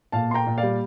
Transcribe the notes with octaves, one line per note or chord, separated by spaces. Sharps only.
A#2 F5 A5
A#3 G5 A#5 C6
A#2
D5 F5
G3